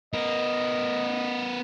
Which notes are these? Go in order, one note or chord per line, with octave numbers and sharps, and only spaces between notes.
B3 A#4 D#5